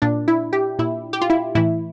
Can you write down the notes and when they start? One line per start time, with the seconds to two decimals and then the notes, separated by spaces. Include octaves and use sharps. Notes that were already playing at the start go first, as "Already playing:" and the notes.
0.02 A#2 D4
0.28 E4
0.53 G4
0.79 A#2 E4
1.13 G4
1.21 F4
1.30 E4
1.55 A2 E3 E4